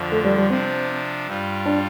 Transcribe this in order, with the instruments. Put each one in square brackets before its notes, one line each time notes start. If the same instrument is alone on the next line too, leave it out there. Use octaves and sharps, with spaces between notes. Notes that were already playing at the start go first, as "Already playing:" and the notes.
Already playing: [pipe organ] F2 D3 F3
[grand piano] A3
G3
G3
[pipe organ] C3 F3 D4 [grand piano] C4
[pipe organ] G2 G3 F4
[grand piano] D4